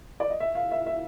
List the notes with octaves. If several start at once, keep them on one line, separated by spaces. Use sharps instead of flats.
D5
D#5
E5
F5
E5
E5